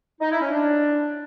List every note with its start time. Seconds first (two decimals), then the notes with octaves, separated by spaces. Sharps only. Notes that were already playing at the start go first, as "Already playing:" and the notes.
0.21 D#4
0.31 E4
0.41 C#4
0.52 D4